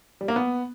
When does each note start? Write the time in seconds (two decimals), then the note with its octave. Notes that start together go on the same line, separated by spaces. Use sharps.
0.21 G3
0.28 A#3
0.36 B3